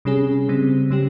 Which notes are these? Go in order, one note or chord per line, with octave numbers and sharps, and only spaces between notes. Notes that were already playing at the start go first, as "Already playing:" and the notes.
C3 G3 C#4 G#4
C#3 G3 C4
C#3 G3 C#4 G4